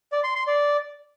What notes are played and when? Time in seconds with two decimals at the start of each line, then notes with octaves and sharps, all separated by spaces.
0.12 D5
0.24 C6
0.35 C6
0.47 D5